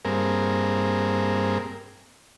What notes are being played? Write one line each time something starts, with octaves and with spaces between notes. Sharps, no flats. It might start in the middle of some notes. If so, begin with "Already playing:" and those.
G2 A#3 C4 G#4 A#4